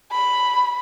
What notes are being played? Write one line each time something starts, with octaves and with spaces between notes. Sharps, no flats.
B5